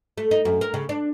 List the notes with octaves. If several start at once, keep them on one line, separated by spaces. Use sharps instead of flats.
A3
D#4
F#2
A#4
C#3
D4